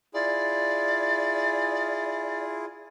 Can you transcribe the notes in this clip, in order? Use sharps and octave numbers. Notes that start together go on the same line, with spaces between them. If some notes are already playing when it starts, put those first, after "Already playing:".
E4 F4 G#4 D5